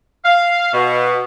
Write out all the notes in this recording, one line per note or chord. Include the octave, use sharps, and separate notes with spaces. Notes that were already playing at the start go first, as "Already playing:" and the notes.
F5
B2